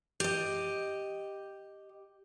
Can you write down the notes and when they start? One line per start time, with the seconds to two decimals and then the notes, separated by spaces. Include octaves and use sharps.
0.20 G4 D#5